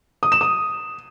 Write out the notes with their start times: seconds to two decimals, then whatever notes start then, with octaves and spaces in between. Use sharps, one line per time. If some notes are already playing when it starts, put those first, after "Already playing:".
0.23 D#6
0.32 E7
0.41 D#6